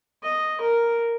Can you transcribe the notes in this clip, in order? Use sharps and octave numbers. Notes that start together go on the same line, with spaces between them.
D#5
A#4